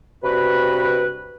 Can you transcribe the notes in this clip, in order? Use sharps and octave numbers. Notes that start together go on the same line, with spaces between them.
G2 C3 F#4 B4